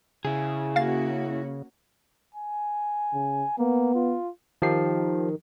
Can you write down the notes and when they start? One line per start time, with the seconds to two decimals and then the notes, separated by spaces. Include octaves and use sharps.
0.25 C#3 E4 G#4
0.76 A#3 C#4 F#4 F5 A6
2.34 G#5
3.13 C#3
3.59 A#3 B3
3.95 F4
4.62 D#3 F3 G4 C7